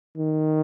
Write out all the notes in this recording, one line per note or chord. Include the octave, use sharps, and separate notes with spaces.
D#3